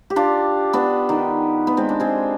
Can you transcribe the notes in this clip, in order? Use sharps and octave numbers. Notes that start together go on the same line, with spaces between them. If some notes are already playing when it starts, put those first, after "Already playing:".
G4
D4 F4
B3 D4
D#3
B3
G#3 C4
D4
G#3 C4